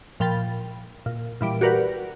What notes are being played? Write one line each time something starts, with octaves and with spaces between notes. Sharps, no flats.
A#2 F3 F5 G5 B5 A6
A#2
A#2 E3 G3 D7
F#4 G4 A#4 B4 D5 F#5